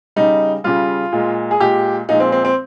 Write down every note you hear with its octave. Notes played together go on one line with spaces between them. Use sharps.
C#3 G3 D#4
C#3 G3 F4
A#2 G#3
G#4
A#2 G#3 G4
A#2 F3 G#3 D#4
C4
C4
C4